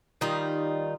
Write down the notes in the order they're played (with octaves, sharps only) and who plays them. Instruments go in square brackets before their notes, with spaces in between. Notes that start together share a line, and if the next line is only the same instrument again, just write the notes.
[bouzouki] D#3 G3 D#4 F4